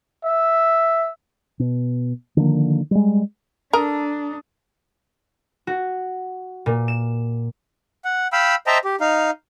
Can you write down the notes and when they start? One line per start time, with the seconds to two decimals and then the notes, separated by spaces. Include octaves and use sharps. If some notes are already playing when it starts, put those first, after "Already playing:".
0.25 E5
1.59 B2
2.37 D3 D#3 F3 A#3
2.91 G3 G#3
3.73 D4 A4 A#4 A#5 D#6
5.67 F#4
6.66 A#2
6.88 E7
8.05 F#5
8.33 F5 G5 B5 E6
8.67 C5 D#5 E5 G5 A5 A#5
8.84 G4
9.01 D#4 F5